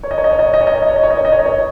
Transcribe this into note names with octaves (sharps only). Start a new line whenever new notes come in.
C#5
D#5
C#5
D#5
C#5
D#5
C#5
D#5
C#5
D#5
C#5
D#5
C#5
D#5
C#5
D#5
C#5
D#5
C#5
D#5
C#5